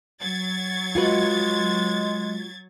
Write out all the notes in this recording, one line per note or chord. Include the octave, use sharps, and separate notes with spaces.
F#3 G#6 A6
G#3 F4 F#4 B4